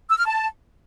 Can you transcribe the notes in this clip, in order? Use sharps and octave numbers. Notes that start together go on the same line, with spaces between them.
E6
F6
A5